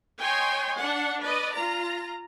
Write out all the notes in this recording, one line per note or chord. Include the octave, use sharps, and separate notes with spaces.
C#5 D#5 G5 G#5 C6
D4 F#5
B4 D5 D#5
F4 A#5